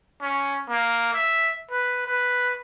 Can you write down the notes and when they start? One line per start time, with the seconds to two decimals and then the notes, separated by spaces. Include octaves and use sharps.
0.22 C#4
0.69 A#3
1.14 E5
1.71 B4
2.06 B4